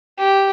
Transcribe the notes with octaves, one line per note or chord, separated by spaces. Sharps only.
G4